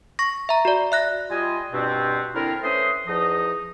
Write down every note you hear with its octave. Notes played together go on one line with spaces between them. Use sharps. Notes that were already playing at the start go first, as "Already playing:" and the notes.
C#6 A#6
E5 A#5
F#4 D5
E5 F#6 A#6
G3 F4 D#5 G#5
G2 B2 B3 C4
D3 C4 D4 E4 F4 A#4
A3 C#4 B4 C5 C6 D#6
E2 F3 D#4 D#5